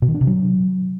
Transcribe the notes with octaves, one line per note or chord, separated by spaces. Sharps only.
B2
D#3
D4
C3
F#3